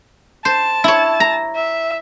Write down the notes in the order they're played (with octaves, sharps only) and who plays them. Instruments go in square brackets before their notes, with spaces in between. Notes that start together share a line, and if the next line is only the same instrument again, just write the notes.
[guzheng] C5 [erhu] A5
[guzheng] E4 C#5
A#5
[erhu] E5